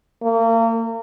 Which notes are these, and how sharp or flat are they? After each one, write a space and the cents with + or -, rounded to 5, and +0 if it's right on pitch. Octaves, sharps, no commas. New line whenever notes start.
A#3 -35